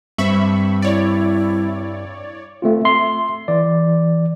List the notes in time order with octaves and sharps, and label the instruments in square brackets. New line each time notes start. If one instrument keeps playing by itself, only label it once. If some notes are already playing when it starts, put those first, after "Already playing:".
[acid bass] G2 [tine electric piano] G3 C4 C5 [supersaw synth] E5 B5 C#6
[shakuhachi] E4 [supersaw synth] C#5 D5
[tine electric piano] A3 C4 F4
E5 C6
E3 D5